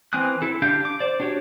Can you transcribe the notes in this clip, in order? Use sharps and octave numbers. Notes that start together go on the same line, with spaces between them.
E3 C4 G#5 D#6 F#6
E4 A4
D3 D4 G4 F5 G6
D6
C5 D5
D4 F#4 G4 C#5